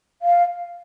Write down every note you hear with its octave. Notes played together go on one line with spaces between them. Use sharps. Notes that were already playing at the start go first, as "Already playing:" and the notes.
F5